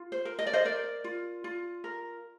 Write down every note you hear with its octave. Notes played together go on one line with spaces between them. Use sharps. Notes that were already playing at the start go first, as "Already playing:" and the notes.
Already playing: F4
C5
A#4
D#5
D5
C5 D#5
A#4 D5
F4
F4
A#4